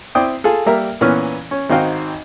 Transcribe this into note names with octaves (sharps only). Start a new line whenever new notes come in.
C4 E4 D5 G5 D#6
F4 G#4 A4
G3 A#3 A#4 E5
A#2 E3 B3 C#4 F6
C#4
G#1 C4 D#4 F#4 F5 G5